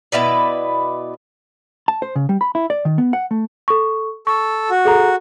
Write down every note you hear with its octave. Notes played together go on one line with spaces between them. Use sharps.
B2 E4 B4 D5
A5
C5
C#3
G3
B5
E4
D5
D#3
B3
F#5
A3
A4 C#6
A4 C#6
F#4
G#4 A4 A#5